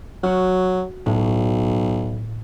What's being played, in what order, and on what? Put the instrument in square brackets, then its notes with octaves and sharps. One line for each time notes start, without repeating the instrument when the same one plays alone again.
[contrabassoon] F#3 [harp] F#4 F6
[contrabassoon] B1 [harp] A2